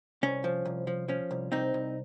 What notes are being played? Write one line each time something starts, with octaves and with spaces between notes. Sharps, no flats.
C2 C#4
F3
C2
F3
F3 C#4
C2
C2 C4 D#4
C2